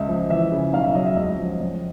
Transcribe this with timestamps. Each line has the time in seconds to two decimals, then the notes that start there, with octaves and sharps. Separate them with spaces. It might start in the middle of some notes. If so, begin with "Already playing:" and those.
Already playing: C#2 E5
0.09 F3
0.30 E3 E5
0.52 C#3
0.73 B1 F5
0.84 E5
0.95 F#3 D#5
1.06 E5
1.16 C#2 D#5
1.38 F3
1.59 F2